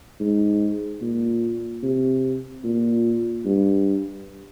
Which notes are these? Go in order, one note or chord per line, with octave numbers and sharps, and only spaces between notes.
G#2
A#2
C3
A#2
G2